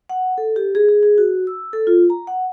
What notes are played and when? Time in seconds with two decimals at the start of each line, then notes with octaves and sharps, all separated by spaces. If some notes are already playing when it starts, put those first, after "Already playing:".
0.09 F#5
0.38 A4
0.56 G4
0.75 G#4
0.89 G#4
1.03 G#4
1.18 F#4
1.47 E6
1.73 A4
1.87 F4
2.10 A#5
2.27 F#5